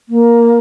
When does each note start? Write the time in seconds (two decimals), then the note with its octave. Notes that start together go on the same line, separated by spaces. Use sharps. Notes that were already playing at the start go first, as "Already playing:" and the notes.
0.09 A#3